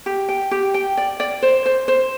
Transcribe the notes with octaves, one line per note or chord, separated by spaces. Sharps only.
G4
G5
G4
G5
D5
D5
C5
C5
C5